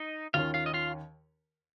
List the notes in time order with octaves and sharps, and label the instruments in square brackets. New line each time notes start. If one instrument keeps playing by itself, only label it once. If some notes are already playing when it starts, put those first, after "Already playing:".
Already playing: [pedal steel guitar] D#4 D#5
[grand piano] D#2 D#3 C#4 [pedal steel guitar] F4 F5
[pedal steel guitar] F4 F5
D#5
F4 F5